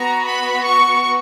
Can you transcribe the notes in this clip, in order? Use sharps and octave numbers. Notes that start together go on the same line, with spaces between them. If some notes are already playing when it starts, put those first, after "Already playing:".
Already playing: B3 F#4 A#5
B5
C#6